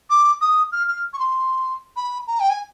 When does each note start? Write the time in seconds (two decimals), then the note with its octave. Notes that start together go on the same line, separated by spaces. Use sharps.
0.10 D6
0.41 D#6
0.72 F6
0.88 F6
1.13 C#6
1.19 C6
1.96 B5
2.27 A#5
2.40 G5
2.50 G#5